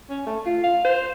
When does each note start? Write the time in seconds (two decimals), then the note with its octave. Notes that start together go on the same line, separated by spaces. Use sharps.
0.10 C#4
0.27 A3
0.46 F4
0.64 F5
0.85 C5